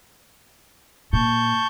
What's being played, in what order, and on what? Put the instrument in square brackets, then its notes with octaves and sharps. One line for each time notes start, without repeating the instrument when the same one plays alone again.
[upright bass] A#2 [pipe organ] A5 C#6 G6